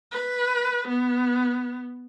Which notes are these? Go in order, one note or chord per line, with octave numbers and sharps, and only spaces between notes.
B4
B3